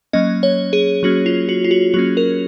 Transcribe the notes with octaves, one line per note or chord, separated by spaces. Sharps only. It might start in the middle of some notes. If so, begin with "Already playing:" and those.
F#3 A#3 C#4 D#5
C#5
G#4
F#3 A#3 C#4 F#4
F4
F#4
F4
F#4
F#3 A#3 C#4 F#4
A#4